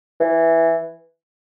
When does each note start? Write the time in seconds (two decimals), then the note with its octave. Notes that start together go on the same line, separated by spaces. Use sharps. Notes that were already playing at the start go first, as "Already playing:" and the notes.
0.20 E3